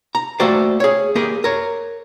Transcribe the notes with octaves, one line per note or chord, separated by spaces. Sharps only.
A#5
A3 A#3 F#4 G4 C5 D5
G#4 C#5
A#3 G4 G#4 A#4
A#4 C#5